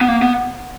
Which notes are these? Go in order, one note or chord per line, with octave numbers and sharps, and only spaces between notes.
B3
A#3
B3